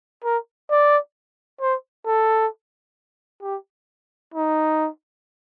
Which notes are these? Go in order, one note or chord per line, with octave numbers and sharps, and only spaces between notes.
A#4
D5
C5
A4
G4
D#4